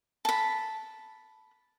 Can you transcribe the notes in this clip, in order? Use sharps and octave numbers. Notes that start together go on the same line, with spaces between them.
A5 B5